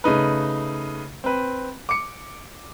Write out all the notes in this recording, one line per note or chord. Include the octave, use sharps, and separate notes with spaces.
C#3 A3 D#4 B4
C4 B4
D6 C#7